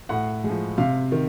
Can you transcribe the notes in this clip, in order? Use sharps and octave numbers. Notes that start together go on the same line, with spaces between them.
A2 F#5
F3 G#3
C3 F5
D#3